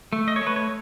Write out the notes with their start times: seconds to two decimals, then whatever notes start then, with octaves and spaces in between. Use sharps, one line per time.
0.13 A3
0.28 D#5
0.36 C#5
0.41 A3
0.47 B4
0.56 C#5